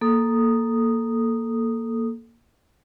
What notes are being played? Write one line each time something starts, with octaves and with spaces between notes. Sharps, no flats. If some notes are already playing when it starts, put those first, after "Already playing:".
A#3 A4 D#6